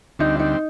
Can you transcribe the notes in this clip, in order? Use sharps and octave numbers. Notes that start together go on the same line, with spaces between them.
D2 D3 G3 C4 D#4
D#4